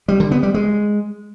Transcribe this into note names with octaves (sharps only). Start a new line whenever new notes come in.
G3
D3
B3
G3
G#3